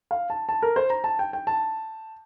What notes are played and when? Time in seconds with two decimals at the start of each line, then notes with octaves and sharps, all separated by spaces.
0.11 F5
0.30 A5
0.49 A5
0.62 A#4
0.76 C5
0.90 A#5
1.04 A5
1.19 G5
1.33 G5
1.47 A5